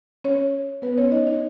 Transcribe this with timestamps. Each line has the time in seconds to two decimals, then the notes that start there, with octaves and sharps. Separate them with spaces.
0.24 C#4 C#5
0.82 B3 B4
0.98 C#4 C#5
1.11 D#4 D#5
1.27 D#4 D#5